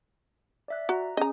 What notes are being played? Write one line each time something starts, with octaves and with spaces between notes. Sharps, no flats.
D5 E5 F#6
F#4 A#5
C#4 G#4 D#5 A#5